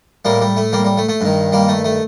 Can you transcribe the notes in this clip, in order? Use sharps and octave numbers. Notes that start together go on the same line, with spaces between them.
A2 G3 A#3
G3
A3
G3 A#3
G3
A3
A3
G2 D#3
G3 A#3
A3
A3